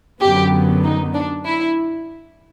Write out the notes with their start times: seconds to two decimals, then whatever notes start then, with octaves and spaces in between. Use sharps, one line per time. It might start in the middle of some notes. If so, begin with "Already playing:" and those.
0.21 F#2 D3 F#3 B3 G4
0.84 D#4
1.14 D4
1.45 E4